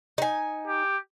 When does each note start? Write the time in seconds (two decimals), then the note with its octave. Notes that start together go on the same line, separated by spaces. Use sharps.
0.18 D#4 G#5
0.67 G4